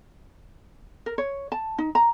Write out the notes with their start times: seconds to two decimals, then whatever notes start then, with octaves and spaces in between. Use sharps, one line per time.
1.06 A#4
1.18 C#5
1.52 A5
1.78 D#4
1.95 A#5